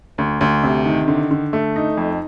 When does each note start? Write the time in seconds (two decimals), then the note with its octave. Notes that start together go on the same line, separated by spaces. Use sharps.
0.18 D2
0.41 D2
0.64 C3
0.86 D#3
1.08 D3
1.31 D3
1.53 A3
1.76 D#4
1.97 F2